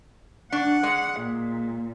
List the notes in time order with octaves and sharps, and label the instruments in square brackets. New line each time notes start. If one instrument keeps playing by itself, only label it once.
[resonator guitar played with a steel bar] D4 [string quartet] F#5
[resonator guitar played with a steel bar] G#3 D5
[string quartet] A#2